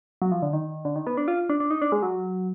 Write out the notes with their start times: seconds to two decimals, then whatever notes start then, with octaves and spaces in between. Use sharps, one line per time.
0.22 F#3
0.32 F3
0.42 D3
0.53 D#3
0.85 D3
0.96 D#3
1.07 B3
1.17 D4
1.28 F4
1.49 D4
1.60 D4
1.71 D#4
1.82 D4
1.92 G#3
2.03 F#3